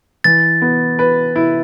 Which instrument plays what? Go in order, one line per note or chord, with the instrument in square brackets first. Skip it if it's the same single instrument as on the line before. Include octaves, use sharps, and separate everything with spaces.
[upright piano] E3 [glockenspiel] A6
[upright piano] B3
B4
E4